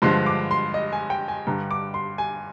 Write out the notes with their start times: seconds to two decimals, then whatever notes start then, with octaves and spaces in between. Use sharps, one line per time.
0.02 G2 D3 F3 G#3 C6
0.26 D6
0.51 C6
0.74 D#5
0.92 G#5
1.10 G5
1.28 G#5
1.47 G2 D3 G3 A#5
1.71 D6
1.94 C6
2.18 G#5